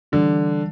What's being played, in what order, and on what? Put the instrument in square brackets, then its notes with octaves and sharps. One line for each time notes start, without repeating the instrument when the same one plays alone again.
[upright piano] D3 [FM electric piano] E3 G3 D4